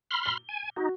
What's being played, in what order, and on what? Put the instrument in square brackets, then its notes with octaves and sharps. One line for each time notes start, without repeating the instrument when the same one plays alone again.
[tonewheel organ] B5 C6 F6
[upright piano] G7
[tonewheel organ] G#5
[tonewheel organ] D#4 [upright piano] F#4